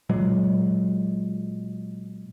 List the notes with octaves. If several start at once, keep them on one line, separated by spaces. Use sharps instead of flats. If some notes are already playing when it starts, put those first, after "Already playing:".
A#2 F#3 G#3